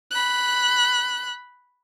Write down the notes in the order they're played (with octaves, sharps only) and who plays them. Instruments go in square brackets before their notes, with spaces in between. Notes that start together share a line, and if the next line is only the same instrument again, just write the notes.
[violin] B5 F#6